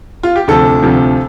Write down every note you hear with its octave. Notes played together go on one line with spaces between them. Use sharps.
F4
G4
D2 C3 F3 A4
D2 C3 F3